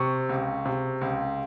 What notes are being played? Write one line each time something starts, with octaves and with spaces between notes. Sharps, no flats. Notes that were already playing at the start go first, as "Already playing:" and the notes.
Already playing: C3 C#6
C#2
C3
C#2